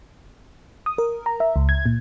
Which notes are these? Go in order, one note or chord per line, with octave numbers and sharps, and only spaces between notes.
D#6
A#4
A#5
E5
C#2
G#6
A#2